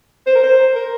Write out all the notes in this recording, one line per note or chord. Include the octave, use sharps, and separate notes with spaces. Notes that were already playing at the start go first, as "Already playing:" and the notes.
C5
A#4
C5
A#4